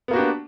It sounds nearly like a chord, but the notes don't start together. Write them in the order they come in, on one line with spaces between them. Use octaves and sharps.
B3 A#3 F#4 G4 D4